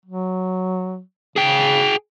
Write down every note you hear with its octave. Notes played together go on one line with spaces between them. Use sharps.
F#3
C#3 G#4 G5